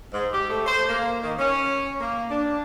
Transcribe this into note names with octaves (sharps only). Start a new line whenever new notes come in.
G#2
G4
A3
C5
A#3
D#3
C#4
A#3
D4